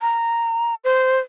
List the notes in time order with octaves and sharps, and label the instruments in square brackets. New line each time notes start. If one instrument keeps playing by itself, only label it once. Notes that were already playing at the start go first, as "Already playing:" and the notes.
[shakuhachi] A#5
C5